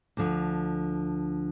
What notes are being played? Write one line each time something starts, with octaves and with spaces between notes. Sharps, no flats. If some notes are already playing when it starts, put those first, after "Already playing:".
D2 D3 F3